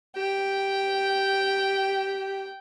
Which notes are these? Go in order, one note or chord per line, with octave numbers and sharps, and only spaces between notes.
G4 G5